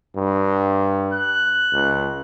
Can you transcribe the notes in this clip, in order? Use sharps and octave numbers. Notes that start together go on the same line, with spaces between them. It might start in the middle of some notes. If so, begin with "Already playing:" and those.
G2
F#6
C#2